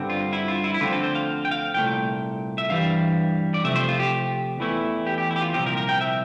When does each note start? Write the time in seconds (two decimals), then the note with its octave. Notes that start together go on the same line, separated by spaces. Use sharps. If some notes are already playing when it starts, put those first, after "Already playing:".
Already playing: G2 D3 G3 C4
0.10 F4
0.33 E4
0.48 F4
0.64 E4
0.74 E4
0.80 D2 D3 F3 C4 F4
0.93 A4
1.04 C5
1.15 F5
1.45 G5
1.51 F5
1.74 C2 A#2 A3 G5
2.58 E5
2.69 G2 E3 G3 F5
3.54 D5
3.64 C3 F3 A3 E5
3.76 C5
3.89 F4
3.99 G4
4.59 E2 E3 A3 E4
5.07 G4
5.18 G4
5.31 E4
5.36 G4
5.41 F4
5.53 C2 A#2 F3 C4 G4
5.66 A#4
5.78 A#4
5.89 G5
6.01 E5